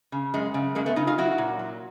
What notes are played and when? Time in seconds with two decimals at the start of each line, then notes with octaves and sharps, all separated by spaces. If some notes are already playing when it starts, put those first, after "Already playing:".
0.12 C#3
0.34 F#2 G#3
0.54 C#3
0.75 F#2 G#3 A#3
0.86 A3 B3
0.96 C#3 D#4 F4
1.07 D#4 F4
1.18 F#3 E4 F#4
1.38 A#2
1.59 F#3